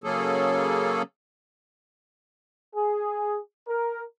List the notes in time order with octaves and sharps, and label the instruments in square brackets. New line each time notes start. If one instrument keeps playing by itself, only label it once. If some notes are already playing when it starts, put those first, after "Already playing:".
[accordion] C#3 F#3 A#3 C#4 G#4 A4
[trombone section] G#4
A#4